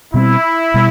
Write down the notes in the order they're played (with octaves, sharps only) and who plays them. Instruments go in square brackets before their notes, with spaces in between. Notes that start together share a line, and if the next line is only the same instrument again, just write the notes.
[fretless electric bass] B2 G3 C4 [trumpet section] E4
[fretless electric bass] B2 G3